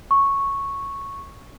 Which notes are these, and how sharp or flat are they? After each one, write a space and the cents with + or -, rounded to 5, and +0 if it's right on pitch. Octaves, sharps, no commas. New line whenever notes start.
C#6 -5